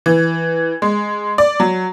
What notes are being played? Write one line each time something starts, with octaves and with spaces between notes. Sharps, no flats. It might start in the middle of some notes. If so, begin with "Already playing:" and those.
E3
G#3
D5
F#3